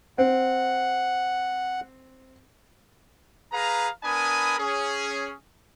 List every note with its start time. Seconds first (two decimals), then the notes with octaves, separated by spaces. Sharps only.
0.18 C4 F#5
3.52 G#4 B4 F5 A#5
4.04 B3 D4 A#4 G#5 B5 D#6
4.59 C#4 G#4